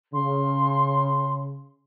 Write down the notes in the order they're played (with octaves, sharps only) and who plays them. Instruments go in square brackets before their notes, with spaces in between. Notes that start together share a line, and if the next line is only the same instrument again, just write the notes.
[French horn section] C#3 [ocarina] C6